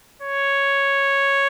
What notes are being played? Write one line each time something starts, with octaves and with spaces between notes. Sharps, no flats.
C#5